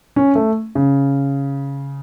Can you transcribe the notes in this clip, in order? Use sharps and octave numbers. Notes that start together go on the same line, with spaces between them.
C#4
A3
C#3